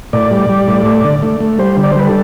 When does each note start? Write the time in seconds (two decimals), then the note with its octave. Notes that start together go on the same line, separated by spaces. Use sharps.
0.13 A2 D5
0.31 G3
0.49 G3
0.67 A2
0.86 A3
1.04 D3
1.22 A3
1.40 A3
1.59 G3 C5
1.77 D3
1.83 D5
1.92 C5
1.96 G3 B4
2.07 A4